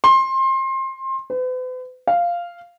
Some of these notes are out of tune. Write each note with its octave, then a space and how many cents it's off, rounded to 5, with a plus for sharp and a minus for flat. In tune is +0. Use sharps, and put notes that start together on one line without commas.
C6 +25
B4 +45
F5 -5